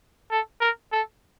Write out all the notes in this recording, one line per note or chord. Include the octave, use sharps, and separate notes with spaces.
A4
A#4
A4